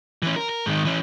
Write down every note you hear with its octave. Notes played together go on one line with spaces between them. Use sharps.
E3 C#4
A#4
A#4
G#2 D#3
E3 C#4